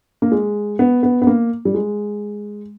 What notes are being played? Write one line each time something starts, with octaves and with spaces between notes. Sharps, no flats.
A#3
G#3
B3
B3
B3
A#3
G3
G#3